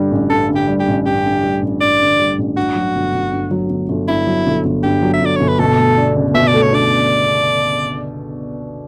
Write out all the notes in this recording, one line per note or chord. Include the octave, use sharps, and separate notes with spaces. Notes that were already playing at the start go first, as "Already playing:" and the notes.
Already playing: G2 D3 G3
A1
G2 A4
D3
G4
G3
G4
A1
G2 G4
D3
G3
A1
G2 D5
D3
G3
A1
G2 F#4
F#3
G1
G1
G2
F#3
G1
G1
G2 E4
F#3
G1
G1
G2 G4
F#3
E5
G1 D5
G1 C#5
B4
B2 A4
A3
D4
C#2
B2 E5
D5
A3
C#5
D4 D5